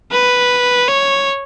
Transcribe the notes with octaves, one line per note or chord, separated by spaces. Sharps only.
B4
C#5